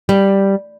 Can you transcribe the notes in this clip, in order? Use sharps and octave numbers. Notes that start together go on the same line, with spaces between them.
G3